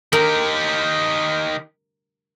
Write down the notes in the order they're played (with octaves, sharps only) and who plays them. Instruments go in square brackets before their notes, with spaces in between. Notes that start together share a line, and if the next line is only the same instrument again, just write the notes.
[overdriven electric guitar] D#3 G4 [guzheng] A#4